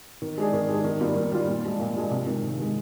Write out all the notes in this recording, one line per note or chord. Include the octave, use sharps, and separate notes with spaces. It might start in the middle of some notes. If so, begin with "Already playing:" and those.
D#3
G#3 D4 G#4
D#3
G#3 D4 G#4
D#3
G3 A#3 F4
D#3
G3 A#3 F4
A#2
F3 G#3 D4
A#2
F3 G#3 D4
C3
D#3 G#3
C3
D#3 G#3